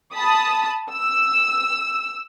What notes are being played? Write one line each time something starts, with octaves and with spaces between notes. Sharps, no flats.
A5 B5 D#6
E6